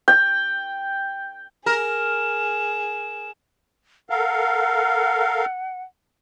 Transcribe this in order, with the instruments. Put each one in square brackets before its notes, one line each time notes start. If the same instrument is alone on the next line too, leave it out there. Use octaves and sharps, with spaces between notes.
[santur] G5
[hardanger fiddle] G#4 [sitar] A#4 [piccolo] E7
[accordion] A4 A#4 F5 [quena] F#5